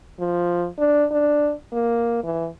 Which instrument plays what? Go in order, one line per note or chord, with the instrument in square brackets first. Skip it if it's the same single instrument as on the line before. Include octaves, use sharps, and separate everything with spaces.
[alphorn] F3
D4
D4
A#3
E3